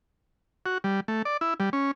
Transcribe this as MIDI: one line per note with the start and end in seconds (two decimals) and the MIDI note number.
0.66 0.78 66
0.84 1.00 55
1.08 1.22 57
1.25 1.37 74
1.41 1.54 64
1.60 1.70 55
1.73 1.91 61